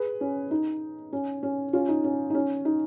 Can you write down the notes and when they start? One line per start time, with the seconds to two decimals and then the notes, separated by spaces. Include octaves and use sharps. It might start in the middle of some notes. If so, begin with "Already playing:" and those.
Already playing: G#4 B4
0.21 C#4
0.51 D#4
1.13 C#4
1.43 C#4
1.73 C#4 F4
1.89 D#4
2.04 C#4
2.30 D#4
2.34 C#4
2.65 D#4